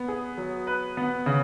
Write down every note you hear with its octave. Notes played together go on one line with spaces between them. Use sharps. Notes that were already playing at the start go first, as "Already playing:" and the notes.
Already playing: B3
G#4
F#3
B4
B3
C#3